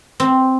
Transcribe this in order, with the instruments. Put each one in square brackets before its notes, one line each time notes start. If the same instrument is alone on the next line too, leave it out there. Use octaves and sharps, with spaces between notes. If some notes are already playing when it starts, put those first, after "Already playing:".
[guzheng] C4